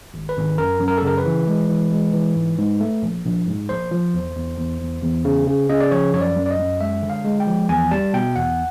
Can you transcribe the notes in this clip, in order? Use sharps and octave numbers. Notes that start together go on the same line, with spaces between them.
G#1
B4
G#1
F#2 A#4
F#2
A#4
A4
C#3 A#4
B4
E3
G#3
E3
G#3
E3
G#2
G#2
A3
A#1
A#1
G#2
A#1 C5
F3
E2
E2
E2
E2
E2
C#3
C#3
C#3 D#5
D5
F3 C#5
F#2 C#5
D5
F#2
D5
D#5
F#2
G#3 E5
D3
F5
G#3
G5
F3
E2 G#5
G3 A5
B2 G5
E2 F#5